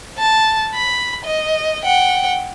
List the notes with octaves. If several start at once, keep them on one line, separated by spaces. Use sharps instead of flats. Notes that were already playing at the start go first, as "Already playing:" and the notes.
A5
B5
D#5
F#5 G5